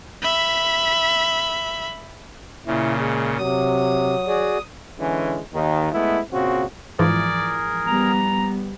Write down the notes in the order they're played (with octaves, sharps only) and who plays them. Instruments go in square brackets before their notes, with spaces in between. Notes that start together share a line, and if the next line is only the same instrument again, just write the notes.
[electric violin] E5 B5
[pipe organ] A#2 C#3 [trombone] E4
[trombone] G#3
[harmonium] C3 [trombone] F#3 [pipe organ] D#6
[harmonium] F#4 G#4 D5
[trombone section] D3 E3 G#3 C#4
D#2 D#3
G#3 A3 B3 E4
A#2 C#3 C4 F#4
[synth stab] G#2 E3 F3 [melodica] G#4 A#4 [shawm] D5
[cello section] G3 B3 [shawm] A#5